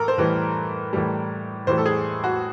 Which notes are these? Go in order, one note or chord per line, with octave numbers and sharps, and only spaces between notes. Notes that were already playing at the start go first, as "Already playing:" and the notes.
Already playing: A2 E3 A4 A#4
C5
A2 E3 G3 B4
A2 E3 G3
A2 E3 G3 C5
A4
G#4
F#4